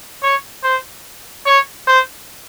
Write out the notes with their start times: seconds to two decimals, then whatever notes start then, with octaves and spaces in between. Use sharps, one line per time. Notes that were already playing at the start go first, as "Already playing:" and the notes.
0.23 C#5
0.64 C5
1.46 C#5
1.87 C5